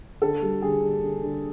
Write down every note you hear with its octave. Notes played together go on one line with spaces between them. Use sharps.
D3 A4
G3
D3 G#4
D3
D3
D3